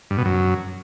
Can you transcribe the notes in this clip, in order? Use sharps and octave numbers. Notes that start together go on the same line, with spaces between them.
G2
B2
F#2